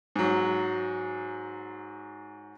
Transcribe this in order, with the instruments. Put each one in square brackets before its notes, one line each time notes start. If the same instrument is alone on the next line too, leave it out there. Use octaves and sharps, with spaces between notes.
[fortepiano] G#2 F#3